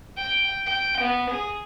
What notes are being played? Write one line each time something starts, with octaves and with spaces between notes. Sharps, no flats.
G5
G5
B3
G#4